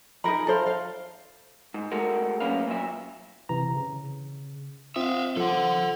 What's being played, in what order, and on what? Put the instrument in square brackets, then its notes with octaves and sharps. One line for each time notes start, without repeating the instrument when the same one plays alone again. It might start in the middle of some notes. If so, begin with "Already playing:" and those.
[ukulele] D#4 G#4 A#4 B5
A4 C5 F5
F5
[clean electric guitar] G#2
G#3 A3 F#4 A#4
F#3 A#3 C#4 B4 F5
A#2 F#3 E5
[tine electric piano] C3 E3 A#5
C#3
[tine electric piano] C4 F4 D#6 [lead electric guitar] E5 F5
[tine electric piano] F3 [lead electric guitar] A4 F#5